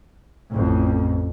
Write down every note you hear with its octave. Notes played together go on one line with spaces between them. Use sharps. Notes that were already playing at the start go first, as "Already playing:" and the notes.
A1 F2